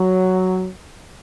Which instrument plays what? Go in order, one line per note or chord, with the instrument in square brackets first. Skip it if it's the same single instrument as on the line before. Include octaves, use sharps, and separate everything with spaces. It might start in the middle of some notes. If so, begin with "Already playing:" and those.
Already playing: [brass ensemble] F#3